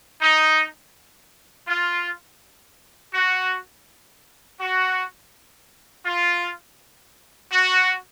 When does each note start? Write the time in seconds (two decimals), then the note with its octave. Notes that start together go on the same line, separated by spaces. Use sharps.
0.22 D#4
1.68 F4
3.14 F#4
4.60 F#4
6.06 F4
7.52 F#4